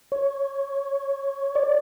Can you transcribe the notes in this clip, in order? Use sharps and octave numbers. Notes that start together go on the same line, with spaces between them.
C#5
D5